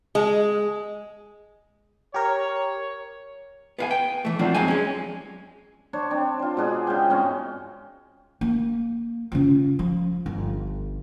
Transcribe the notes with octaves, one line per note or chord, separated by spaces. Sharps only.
G#3
G4 A#4 C#5
B3 F5 G#5
G5
E3 A3
D#3 F3 F#3 C4 D4 F4
F2 G#3 C4 G#5
G#3 C#4
D4 C5 C#5
C4 D4
F4 C5
B2 G#3 D4 G#4
C#3 G#3 G5
G#2 C4 C#4 D#5
A#3
C#3 F4
F3
G1